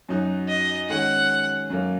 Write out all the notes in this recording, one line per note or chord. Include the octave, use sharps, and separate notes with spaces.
F#2 F#3 D#4 F#4
D#5
D#3 G#3 C#4 F#5
F#2 F#3 A#3